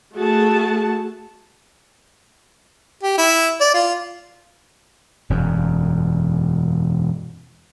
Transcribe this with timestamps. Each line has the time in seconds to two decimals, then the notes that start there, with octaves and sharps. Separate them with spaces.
0.15 A3 F#4 G#4 A5
3.03 G4
3.17 E4
3.61 D5
3.74 F4
5.30 E1 F#2